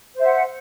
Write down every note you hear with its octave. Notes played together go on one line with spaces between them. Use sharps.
C5 E5 F#5